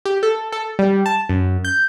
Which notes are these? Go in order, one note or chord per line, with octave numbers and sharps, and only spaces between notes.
G4
A4
A4
G3
A5
F#2
G6